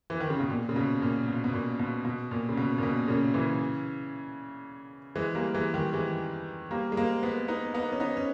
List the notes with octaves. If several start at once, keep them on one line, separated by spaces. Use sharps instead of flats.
E3
D#3
C#3
B2
A#2
C#3
B2
A#2
B2
B2
A#2
B2
B2
A#2
C#3
B2
A#2
B2
A#2 C#3
C#3 E3
E3 G#3
G3 A#3
E3 G#3
D#3 G3
E3 G#3
G3 A#3
G#3
G3 A#3
G#3 B3
B3 D#4
B3 D#4
C#4
B3 D#4
C#4